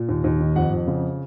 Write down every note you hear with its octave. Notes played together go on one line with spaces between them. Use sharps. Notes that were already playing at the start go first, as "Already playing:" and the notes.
Already playing: A#2
D#2
D#2
D#3
F2 F#5
F2
C#3